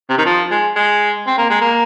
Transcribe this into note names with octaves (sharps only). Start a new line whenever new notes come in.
C3
D#3
F3
G#3
G#3
C4
A#3
G#3
A#3